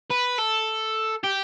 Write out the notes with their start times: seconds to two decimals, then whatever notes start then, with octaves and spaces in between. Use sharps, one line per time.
0.11 B4
0.39 A4
1.24 G4